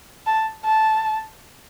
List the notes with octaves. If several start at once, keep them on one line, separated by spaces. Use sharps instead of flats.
A5
A5